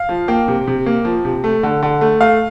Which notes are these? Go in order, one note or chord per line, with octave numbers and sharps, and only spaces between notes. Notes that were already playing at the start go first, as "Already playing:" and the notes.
Already playing: F5
F3
A#3 G5
C3
C3
A#3
F3
C3
A3
D3
D3
A3
A3 F5